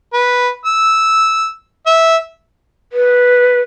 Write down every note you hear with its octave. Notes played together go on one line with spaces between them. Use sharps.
B4
E6
E5
B4